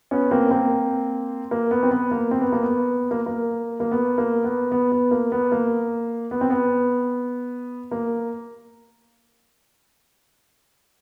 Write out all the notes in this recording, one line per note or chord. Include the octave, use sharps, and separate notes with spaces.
B3 C#4
A#3 C4
A#3 C4
A#3
B3
C4
B3
A#3
C4
B3
A#3
B3
A#3
A#3
A#3
B3
A#3
B3
B3
B3
A#3
B3
A#3
B3
C4
B3
A#3